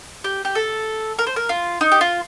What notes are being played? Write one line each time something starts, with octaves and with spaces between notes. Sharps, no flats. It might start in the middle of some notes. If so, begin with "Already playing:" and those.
G4
G4
A4
A#4
C5
A#4
F4
D#4
G4
F4